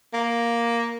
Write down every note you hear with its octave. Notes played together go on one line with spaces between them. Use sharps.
A#3